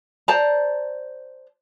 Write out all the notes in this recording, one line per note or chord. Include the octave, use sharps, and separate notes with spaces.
C5 D5 A5 A#5